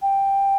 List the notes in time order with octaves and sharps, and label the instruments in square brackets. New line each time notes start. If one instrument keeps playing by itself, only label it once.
[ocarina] G5